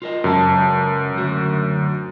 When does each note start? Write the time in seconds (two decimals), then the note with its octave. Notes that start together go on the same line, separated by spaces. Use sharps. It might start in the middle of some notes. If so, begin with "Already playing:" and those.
0.02 F4 A#4 D#5
0.24 F#2 C#3 G#3 A5
1.16 D2 F#4